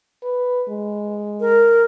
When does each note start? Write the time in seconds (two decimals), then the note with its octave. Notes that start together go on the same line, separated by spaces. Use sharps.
0.23 B4
0.69 G#3
1.40 A#4